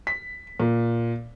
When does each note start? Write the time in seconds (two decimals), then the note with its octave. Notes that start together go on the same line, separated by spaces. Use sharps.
0.07 B6
0.60 A#2